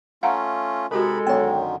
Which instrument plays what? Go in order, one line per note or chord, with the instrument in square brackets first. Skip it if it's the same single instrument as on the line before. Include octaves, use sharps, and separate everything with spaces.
[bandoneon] A3 C#4 F4 [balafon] F5 F#5 A#5
[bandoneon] C3 D#4 B5 [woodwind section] G#3 A4 [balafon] F#4 G4 A#4
[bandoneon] F#2 D3 D#3 [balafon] B3 [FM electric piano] C#5 G5